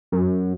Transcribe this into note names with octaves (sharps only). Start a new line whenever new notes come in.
F#2